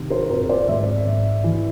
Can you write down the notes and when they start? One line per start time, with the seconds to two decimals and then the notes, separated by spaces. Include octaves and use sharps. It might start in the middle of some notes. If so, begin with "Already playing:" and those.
Already playing: C3 D#3
0.10 A#4 C5
0.30 F2 A#4 C5
0.49 C5 D5
0.68 G#2 D5 E5
1.06 G#2
1.44 E3